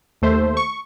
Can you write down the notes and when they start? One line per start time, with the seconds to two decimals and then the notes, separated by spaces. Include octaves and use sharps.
0.22 D#2 A3 C5 E5
0.57 C#6